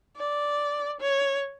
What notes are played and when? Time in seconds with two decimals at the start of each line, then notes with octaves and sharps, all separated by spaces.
0.17 D5
1.00 C#5